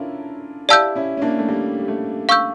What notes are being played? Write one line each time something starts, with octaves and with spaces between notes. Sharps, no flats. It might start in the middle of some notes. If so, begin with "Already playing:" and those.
Already playing: C#4 D4 E4 F4 A4 A#4
E4 G4 D5 F5 A5 E6 G6
C#4 E4
C#4
A#3 D4
A3
G3 A#3
G3
A3
F5 C#6 E6 G6